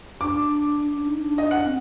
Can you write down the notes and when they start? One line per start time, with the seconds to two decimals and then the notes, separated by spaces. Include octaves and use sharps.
0.21 D4 D6
0.93 D4
1.08 D#4
1.21 D4
1.38 D#5
1.51 F#5
1.65 C4